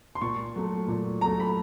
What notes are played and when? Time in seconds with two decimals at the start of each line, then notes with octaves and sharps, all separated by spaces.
0.15 C6
0.21 A#2 C#6
0.56 F#3 A3
0.88 A#2
1.21 F#3 A3 A#5
1.40 B5